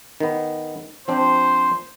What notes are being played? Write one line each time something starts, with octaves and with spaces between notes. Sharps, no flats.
D#3 B3
F3 C4 D4 C5